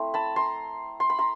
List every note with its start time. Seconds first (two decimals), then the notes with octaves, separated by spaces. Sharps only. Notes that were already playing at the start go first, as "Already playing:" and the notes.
Already playing: A3 C4 E4
0.14 A5 B5
0.36 A#5 C6
1.00 C6
1.10 B5
1.19 A#5 C6